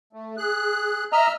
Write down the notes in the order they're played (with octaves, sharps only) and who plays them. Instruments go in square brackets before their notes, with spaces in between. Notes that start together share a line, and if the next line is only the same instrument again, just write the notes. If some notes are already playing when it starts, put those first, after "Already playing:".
[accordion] A3
G#4 F#6
[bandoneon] D#5 A#5 [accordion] E5 E6 F6